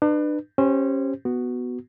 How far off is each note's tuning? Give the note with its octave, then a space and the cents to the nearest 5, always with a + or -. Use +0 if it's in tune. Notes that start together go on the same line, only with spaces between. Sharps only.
D4 +35 B4 +0
C#4 -20 G4 +0 C5 +0
B3 +0 F#4 +0